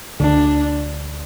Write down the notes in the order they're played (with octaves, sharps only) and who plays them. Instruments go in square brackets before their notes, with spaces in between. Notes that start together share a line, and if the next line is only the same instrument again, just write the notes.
[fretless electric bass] D2 D3 [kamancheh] D4